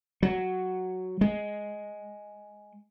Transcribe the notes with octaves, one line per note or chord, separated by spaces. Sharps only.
F#3
G#3